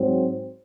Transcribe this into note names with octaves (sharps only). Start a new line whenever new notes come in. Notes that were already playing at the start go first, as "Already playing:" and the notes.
Already playing: G#2 F#3 C4